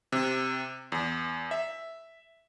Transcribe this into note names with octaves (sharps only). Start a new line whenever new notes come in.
C3
E2
E5